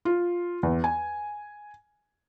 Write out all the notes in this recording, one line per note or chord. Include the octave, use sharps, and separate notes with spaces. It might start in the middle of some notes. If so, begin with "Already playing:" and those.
F4
E2
G#5